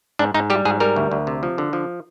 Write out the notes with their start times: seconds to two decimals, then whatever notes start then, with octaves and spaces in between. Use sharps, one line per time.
0.19 G#2 D4
0.34 G#2 D#4
0.50 G3 G4
0.65 G#2 G#4
0.80 G3 A#4
0.96 D2
1.11 D2
1.27 C3
1.43 F3
1.58 D3
1.73 F3